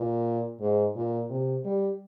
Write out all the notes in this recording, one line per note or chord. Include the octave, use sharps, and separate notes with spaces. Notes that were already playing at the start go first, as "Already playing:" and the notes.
Already playing: A#2
G#2
A#2
C3
G3